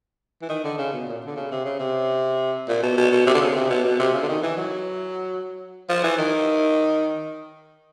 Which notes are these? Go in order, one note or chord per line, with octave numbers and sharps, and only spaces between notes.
E3
D#3
D3
C#3
B2
A#2
D3
C#3
C3
C#3
C3
A#2
B2
B2
B2
C3
D3
C#3
C3
B2
B2
C3
C#3
D3
D#3
E3
F#3
F3
E3
D#3